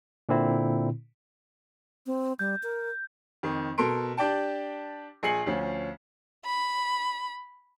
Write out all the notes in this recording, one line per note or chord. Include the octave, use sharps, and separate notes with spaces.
A#2 D3 C4 E4
C4
G3 G6
A#4
F2 D#3
B2 A4 A#4 C6 D7
D4 G4 D5 G5 A5
A#1 G#4 G#5 C7 C#7 F#7
D2 F3 C#4
B5